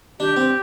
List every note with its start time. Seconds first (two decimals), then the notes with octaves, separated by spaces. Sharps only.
0.19 D4 G4
0.36 C4